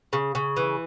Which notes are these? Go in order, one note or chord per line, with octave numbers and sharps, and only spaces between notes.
C#3
C#3
E3